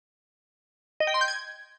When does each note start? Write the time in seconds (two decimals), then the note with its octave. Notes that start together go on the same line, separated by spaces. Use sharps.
1.00 D#5
1.07 G5
1.14 C6
1.21 G6
1.28 G#6